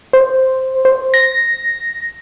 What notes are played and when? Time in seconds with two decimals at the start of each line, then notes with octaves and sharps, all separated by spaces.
0.13 C5
0.85 C5
1.14 A#6